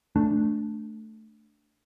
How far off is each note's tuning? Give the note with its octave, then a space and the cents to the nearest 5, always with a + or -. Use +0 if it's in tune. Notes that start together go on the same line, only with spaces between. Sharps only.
A3 +0 D4 -5